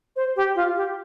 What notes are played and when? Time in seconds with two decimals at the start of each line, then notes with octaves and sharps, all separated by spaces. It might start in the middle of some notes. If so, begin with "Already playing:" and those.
0.16 C5
0.36 G4
0.55 F4
0.76 G4